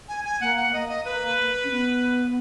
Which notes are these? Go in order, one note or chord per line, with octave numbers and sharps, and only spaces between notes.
G#5
G#5
A#3 F#5
F#5
A#3 D#5
D#5
B4
C#4
B3